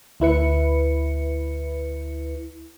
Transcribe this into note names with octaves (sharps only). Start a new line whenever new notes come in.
D2 E4 B4 C#7